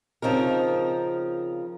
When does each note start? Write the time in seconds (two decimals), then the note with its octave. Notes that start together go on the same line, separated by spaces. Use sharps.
0.22 C#3 F3 C4 D#4 A#4